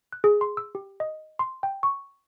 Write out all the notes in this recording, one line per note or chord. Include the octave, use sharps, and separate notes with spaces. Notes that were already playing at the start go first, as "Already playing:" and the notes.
F#6
G#4
C6
E6
G4
D#5
C6
G5
C#6